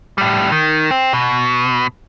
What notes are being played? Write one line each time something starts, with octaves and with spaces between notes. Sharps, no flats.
A2 G3
D#3
C4
B2